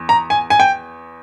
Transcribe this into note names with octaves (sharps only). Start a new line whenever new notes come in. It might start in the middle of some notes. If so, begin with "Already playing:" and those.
Already playing: E2
A#5
G#5
G#5
G5